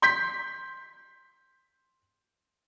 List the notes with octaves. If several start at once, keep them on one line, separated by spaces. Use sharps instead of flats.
C6 G6 B6